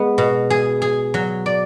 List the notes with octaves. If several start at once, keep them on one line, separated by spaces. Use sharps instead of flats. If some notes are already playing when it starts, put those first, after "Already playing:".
Already playing: G#3 B3
B2
G#4
G#4
F#3
D5